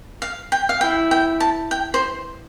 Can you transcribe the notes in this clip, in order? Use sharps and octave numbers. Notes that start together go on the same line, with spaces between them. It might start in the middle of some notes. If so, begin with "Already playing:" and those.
F5
G5
F5
E4 G5
G5
A5
G5
C5